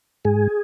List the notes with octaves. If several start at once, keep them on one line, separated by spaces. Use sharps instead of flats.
G#2 G#4